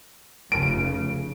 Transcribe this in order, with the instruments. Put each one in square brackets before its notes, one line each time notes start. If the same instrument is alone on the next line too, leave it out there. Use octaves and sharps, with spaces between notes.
[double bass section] F1 C#3 [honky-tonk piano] D7